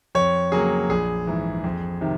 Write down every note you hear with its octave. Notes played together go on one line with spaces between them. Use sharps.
F2 C#5
C#3 F#3 A#3 G#4
A#1 G#4
G#2 E3
F2
C3 D#3